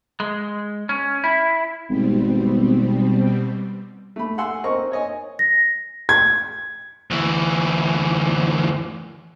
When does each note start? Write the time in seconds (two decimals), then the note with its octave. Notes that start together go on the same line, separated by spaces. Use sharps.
0.20 G#3
0.89 C#4
1.24 E4
1.90 G#1 B2 G3 C4
4.16 A3 B5
4.38 F#5 G#5 C6 E6
4.64 C4 A#4 D#5 C#6
4.92 C#5 D#5 G#5
5.39 A#6
6.09 G#6
7.11 D2 E3